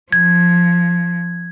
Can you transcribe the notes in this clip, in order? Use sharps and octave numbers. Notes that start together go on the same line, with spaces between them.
F3 G#6